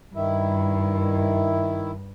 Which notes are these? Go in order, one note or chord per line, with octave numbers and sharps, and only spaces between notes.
G2 D#3 E4